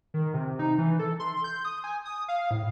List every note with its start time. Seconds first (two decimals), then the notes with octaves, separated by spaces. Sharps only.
0.14 D#3
0.34 C3
0.59 D#4
0.78 E3
0.99 A4
1.20 C6
1.44 G6
1.65 D#6
1.84 G#5
2.05 D#6
2.28 F5
2.51 A2